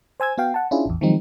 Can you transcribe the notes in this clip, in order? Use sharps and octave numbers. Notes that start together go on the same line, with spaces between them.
C5 G#5 E6 G#6
B3 F#4 F5 G5
F#5 A5
C#4 D4 E4 F4 G#4
A1 E2
D#3 F3 F#3 G#3 C4 D#4